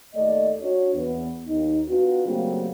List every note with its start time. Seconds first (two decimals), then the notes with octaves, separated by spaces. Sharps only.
0.14 D#2 A3 D5 D#5
0.61 D4 F#4 C#5
0.95 E2 B3
1.47 D#2 D#4
1.87 B3 D4 F4 F#4
2.26 C#3 F#3 G3 A3 A#3 C4